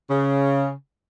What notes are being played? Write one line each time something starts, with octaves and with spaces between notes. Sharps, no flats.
C#3